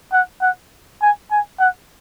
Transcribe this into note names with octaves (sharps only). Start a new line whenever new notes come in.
F#5
F#5
G#5
G#5
F#5